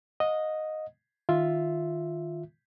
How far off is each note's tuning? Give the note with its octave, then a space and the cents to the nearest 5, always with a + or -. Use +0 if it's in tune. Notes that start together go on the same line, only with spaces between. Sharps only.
D#5 +0 F#5 -45
D#3 +0 F4 +0 E5 +0